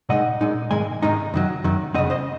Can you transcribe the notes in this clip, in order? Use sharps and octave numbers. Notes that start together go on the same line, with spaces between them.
A#2 G#3 D#4 D#5 F#5
A#2 G#3 D#4
G#2 D#3 G#3 G#5
G#2 D#3 G#3 D#4
F#2 D#3 F#3
F#2 D#3 F#3
F2 C#3 F#3 C4 D#5 F#5
C5 D#5